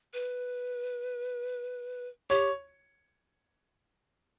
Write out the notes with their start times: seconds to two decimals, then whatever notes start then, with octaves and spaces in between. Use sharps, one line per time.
0.14 B4
2.30 G4 C#5